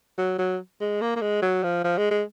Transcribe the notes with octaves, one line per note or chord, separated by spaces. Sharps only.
F#3
F#3
G#3
A#3
A#3
G#3
F#3
F3
F3
G#3
G#3